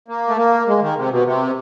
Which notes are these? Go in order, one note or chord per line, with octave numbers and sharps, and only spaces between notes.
A#3
A3
A#3
G#3
D#3
C3
B2
C3